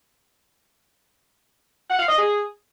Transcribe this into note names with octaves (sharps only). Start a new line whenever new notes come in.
F#5
F5
D#5
G#4